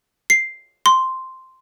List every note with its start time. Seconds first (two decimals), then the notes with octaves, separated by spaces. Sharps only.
0.30 C7
0.86 C6